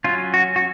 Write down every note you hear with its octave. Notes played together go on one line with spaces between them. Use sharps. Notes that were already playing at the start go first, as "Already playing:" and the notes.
F#3 C#4 F4
F#4
F#4